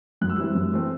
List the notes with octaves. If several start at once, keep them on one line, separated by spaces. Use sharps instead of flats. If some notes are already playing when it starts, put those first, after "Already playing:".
F#2 F#6
E6
E3 G3 C4 E4 F#6
F#2
E3 A3 C4